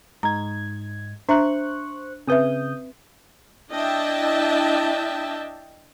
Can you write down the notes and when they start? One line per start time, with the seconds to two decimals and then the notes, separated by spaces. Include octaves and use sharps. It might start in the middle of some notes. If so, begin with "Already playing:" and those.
0.23 G#2 D#4 A#5 G#6
1.29 D4 C5 E5 A#5 C#6 F#6
2.28 C#3 C4 B4 E5 D#6 G6
3.71 D4 E4 D#5 E5 G5 A5